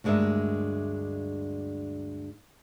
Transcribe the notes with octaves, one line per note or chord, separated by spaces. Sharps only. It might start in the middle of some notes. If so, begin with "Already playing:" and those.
D2 G2 G#3 D4 A#4 E5